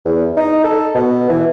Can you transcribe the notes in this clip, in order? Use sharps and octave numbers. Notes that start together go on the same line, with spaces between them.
E2
D#4
A4
B2
E3